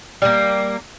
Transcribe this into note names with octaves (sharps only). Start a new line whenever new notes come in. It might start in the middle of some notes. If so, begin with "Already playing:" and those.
G3 A#3